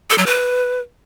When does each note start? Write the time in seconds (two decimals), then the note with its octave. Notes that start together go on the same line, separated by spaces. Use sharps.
0.10 A4
0.18 F#3
0.26 B4